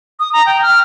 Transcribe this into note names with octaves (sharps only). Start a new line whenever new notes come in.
D#6
A#5
G5
F6